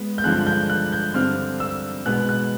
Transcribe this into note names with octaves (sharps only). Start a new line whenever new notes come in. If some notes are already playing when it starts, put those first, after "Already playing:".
Already playing: G#3 B3
G6
G2 D3 F3 G#3 F#6
G6
F#6
G6
G2 D3 G3 C4 F6
E6
B2 G#3 B3 F#6
F#6